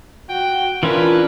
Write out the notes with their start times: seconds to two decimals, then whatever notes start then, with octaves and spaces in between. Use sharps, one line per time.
0.30 F#4 G5
0.83 E3 C#4 D4 F4 A#4 B4